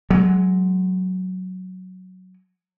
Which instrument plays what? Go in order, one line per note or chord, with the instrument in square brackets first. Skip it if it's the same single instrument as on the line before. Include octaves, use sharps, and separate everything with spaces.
[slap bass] F#3 G#3